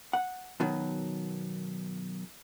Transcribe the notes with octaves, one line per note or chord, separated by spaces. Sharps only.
F#5
B2 D#3 F#3